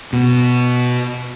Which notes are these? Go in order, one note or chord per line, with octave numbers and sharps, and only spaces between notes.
B2